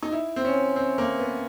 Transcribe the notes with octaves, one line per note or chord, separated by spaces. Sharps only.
D#4
E4
C4
C#4
C4
A#3
B3